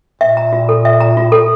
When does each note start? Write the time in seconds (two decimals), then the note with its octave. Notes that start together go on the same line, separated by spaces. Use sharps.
0.21 A#2 E5
0.37 A#5
0.53 F4
0.69 A4
0.85 E5
1.00 A#5
1.17 F4
1.32 A4